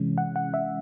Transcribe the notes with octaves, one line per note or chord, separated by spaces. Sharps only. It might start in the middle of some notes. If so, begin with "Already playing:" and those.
Already playing: C3 E3 G#3 C#4
F#5
F#5
E5